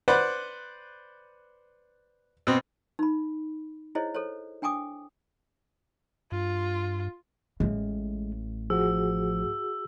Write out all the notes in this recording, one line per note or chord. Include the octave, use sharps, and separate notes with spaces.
B4 C5 D5 F#5
B2 C4
D#4 B5
E4 G#4 C5 C#5 D#5
A4 C5 C#5
D4 G5 G#5 D6 D#6
G2 F4
A1 A2 G#3
F3 F#4 G#4 E6